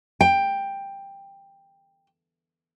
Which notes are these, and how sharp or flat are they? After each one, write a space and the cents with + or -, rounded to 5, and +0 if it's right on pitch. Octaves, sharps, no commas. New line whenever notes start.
G5 +10